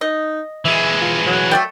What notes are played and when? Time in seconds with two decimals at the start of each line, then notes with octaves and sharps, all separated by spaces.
0.01 D#4 D#5
0.65 E3 G#3 E5
1.02 F4
1.26 F#3
1.51 A3 D5 G5